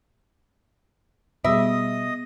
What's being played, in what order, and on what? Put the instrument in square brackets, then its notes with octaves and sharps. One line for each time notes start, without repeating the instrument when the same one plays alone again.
[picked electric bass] B2 G3 [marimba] B3 G#4 [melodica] D#5 D#6 [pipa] E5